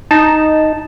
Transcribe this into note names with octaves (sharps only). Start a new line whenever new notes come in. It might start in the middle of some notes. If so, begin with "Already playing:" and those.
D#4 A5